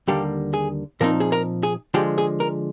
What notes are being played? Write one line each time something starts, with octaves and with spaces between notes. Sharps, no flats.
D#2 D3 G3 A#3 G4
G#4
A#2 F3 C4 D#4 A#4
G#4
A#4
G#4
D3 F3 G#3 G4
G#4
A#4